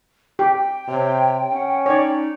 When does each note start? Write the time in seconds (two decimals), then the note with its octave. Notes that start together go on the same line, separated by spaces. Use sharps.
0.39 G4 G5
0.89 C3 C#5
1.53 C#4 F#5
1.86 D#4 C#5 D5